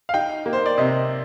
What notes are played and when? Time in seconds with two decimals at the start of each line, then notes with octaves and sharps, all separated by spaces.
0.09 F5
0.14 D#4 G5
0.46 A#3
0.53 C5
0.66 D5
0.78 C3 D#5